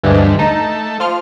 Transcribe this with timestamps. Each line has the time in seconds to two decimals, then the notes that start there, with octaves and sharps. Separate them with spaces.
0.04 D2 G2 E3 F3 G#3
0.39 A3 D#4
1.00 F3 F4 F6